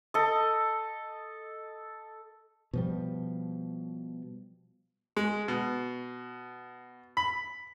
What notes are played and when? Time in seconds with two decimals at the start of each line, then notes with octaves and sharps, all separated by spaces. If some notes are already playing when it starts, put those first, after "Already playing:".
0.14 A4 D#5
2.73 B2 F3 G3
5.17 G#3
5.48 B2
7.17 B5